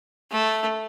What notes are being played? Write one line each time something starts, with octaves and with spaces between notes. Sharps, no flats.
A3